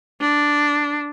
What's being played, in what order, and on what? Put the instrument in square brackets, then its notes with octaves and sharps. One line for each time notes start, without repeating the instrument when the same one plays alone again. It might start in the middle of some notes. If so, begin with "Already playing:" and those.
[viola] D4